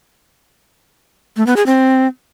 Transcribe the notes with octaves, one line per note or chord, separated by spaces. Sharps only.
A3
B3
G#4
C4